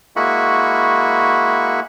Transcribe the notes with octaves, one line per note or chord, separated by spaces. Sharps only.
G#3 A#3 E4 F#4 B5 C#6